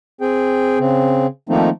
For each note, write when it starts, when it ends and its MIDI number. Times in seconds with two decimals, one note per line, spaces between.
0.21 0.79 60
0.21 0.79 68
0.21 0.79 79
0.79 1.27 49
0.79 1.27 60
1.49 1.69 51
1.49 1.69 53
1.49 1.69 57
1.49 1.69 58
1.49 1.69 60
1.49 1.69 63